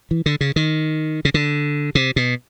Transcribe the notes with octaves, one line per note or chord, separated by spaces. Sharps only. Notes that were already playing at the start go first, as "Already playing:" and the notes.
E3
D3
C#3
D#3
C#3
D3
C3
B2